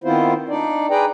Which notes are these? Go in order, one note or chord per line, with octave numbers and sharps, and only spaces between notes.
D#3 B3 C4 E4 F4 C5
D4 D#4 D5
G#4 B4 D5 G5 A#5